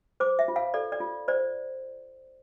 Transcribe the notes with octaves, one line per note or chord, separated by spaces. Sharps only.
C5 D6
E5
F4
F5
A4 D5
D5
F4
C5 D5